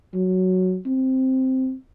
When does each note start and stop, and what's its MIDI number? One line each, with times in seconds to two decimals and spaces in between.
0.14 0.78 54
0.86 1.74 60